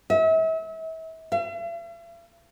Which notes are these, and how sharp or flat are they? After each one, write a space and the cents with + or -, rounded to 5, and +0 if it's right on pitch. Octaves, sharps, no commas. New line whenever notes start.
E5 -35
E5 +45